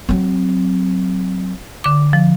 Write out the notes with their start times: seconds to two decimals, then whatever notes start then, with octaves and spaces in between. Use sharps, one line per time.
0.09 F#3 C4
1.84 D3 D6
2.13 F3